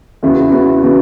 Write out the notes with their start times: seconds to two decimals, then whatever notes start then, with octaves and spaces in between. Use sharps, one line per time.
0.23 E2 C#3 E3 B3 F#4
0.52 E2 C#3 E3 B3 F#4
0.81 C#3 E3 B3 F#4